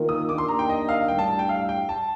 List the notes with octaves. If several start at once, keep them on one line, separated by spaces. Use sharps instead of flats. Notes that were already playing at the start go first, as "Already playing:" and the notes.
Already playing: D#3 A#3 F4 A#4
D#6
D#3 A#3 D4 G4 A#4 D6
C6
A#5
G5
D#5
F5
A2 G3 D4 G5
A5
G5
F5
G5
A5